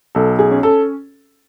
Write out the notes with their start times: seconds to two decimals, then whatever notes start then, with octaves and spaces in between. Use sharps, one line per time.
0.15 B1 A4
0.39 G#4
0.51 C#4
0.63 A4